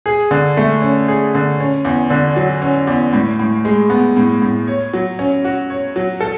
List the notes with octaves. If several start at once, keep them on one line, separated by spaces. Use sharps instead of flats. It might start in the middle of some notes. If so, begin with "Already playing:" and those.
G#4
D3
A3
C#4
G#4
D3
C#4
E2
D3
F#3
C#4
E2
A2
A2
G#3
B3
A2
A2
C#5
F#3
C#4
F#4
C#5
F#3
A4